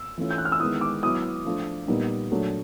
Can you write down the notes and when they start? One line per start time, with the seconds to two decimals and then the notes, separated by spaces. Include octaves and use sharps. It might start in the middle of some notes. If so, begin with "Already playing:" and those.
Already playing: E6
0.18 E3 A3 C#4 F4
0.31 G6
0.38 F#6
0.45 F6
0.52 E6
0.60 D#3 G#3 B3 E4 D#6
0.81 D6
1.03 F#3 B3 E4 D#6
1.45 F3 A3 D4 F4
1.88 A#2 G3 B3 D#4
2.31 A#2 F#3 A3 D4